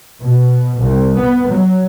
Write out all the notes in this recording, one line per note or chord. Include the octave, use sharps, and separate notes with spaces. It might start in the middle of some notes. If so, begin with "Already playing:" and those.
B2
C2
B3
F#3